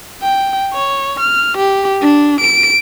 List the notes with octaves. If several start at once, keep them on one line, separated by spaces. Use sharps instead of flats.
G5
C#5
F6
G4
D4
D7